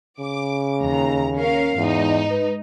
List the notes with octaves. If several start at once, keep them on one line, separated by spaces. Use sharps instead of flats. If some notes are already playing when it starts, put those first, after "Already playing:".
C#3 D6
D#2 A#5
C#4 A#4 F5
E2 G#2 D#4
B4